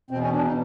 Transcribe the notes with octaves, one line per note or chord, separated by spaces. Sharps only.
E2 B2 C4
C#4
D4
D#4